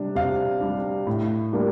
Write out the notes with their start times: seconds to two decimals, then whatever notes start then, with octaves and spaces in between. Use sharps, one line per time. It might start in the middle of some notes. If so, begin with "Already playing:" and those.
Already playing: C3 G3 D4
0.15 C3 F5
0.61 G3 D4
1.07 A2
1.53 G3 A#3 D4